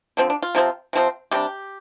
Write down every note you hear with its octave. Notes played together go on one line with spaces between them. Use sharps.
D3 F3 C4
D4
F4
C3 F3 C4
C3 F3 C4
C3 G3 D4 G4